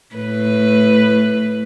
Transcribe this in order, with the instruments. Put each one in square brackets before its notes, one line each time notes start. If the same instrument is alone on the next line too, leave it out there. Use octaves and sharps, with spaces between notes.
[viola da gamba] A2 B4